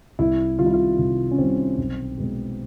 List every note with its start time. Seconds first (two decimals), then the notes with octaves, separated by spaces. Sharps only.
0.19 C2 E4
0.59 C3 D#3 G3 F4
0.66 E4
0.74 F4
0.99 C2
1.31 C#4
1.38 C3 D#3 G3 C4
1.78 B1
2.18 B2 G#3